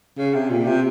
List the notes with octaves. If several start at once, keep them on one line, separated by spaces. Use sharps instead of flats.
C#3
C3
A#2
C3